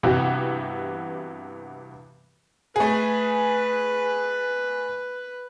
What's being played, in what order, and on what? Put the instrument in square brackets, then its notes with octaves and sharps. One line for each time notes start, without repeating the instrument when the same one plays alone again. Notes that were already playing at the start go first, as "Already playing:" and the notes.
[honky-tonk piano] G2 C3 E3 B3 F#4 G4
[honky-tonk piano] A3 G#4 [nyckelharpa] B4